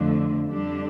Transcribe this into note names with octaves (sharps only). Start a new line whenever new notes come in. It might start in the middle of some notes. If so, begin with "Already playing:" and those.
Already playing: F2 D3 F3 A3 D4
F2 D3 G3 D4 G4